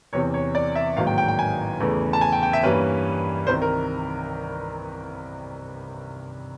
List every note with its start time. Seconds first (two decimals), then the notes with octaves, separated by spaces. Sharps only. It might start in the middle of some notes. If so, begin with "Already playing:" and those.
0.13 E2 C3 E3 C#5
0.34 C#5
0.55 D5
0.75 E5
0.96 A1 G#2 D#3 F#3 A#3 F5
1.07 G5
1.18 G5
1.28 G5
1.39 G#5
1.80 E2 C#3 E3 A3
2.13 A5
2.21 G#5
2.32 G5
2.43 G5
2.53 E5
2.63 G2 E3 G3 A#3 C#4 B4
3.47 C2 C3 D#3 C5
3.62 A#4